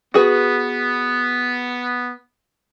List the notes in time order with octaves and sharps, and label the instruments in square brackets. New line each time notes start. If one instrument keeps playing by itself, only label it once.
[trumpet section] B3 [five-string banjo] F#4 G#4 B4